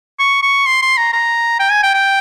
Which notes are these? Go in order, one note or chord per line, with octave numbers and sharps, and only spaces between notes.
C#6
C#6
C6
C6
A#5
A#5
G5
G#5
G5
G5